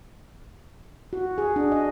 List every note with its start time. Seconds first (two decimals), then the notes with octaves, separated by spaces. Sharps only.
1.13 F#4
1.38 G#4
1.56 D4
1.72 D#5